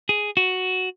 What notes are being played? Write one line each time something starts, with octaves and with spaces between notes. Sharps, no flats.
G#4
F#4